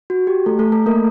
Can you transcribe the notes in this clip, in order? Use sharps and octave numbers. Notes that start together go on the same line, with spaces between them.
F#4
G4
A3 A4
A3 A4
A3 A4
A#3 A#4